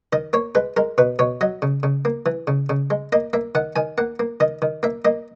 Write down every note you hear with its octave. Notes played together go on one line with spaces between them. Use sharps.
D#3 D#5
A#3 C#5
G#3 B4
G#3 A#4
B2 B4
B2 C#5
F#3 D#5
C#3
C#3
A#3
E3
C#3
C#3
G#3
A#3 D#5
A#3 E5
D#3 F#5
D#3 G#5
A#3 F#5
A#3
D#3 D#5
D#3
A#3 E5
A#3 D#5